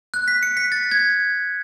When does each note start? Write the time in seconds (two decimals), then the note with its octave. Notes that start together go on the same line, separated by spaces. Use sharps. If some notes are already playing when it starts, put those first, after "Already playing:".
0.14 F#6
0.28 B6
0.43 C#7
0.57 B6
0.72 A6
0.91 G#6